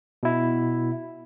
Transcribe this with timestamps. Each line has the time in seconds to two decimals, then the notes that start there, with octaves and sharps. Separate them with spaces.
0.23 B2 E4